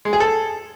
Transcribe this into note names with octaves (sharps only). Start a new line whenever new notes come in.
G#3
G#4
A4